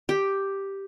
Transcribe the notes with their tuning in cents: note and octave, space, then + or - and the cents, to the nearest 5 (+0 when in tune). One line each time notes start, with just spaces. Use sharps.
G4 +0 G5 +0